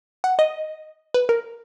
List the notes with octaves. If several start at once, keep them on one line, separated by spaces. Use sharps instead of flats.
F#5
D#5
B4
A#4